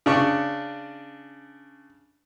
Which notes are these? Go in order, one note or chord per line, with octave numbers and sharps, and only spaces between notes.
C#3 D4 C#6